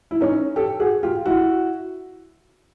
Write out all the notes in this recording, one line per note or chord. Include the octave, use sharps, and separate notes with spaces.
E4
C#4 D#4
G4 A4
F#4 G#4
F4 G4
E4 F#4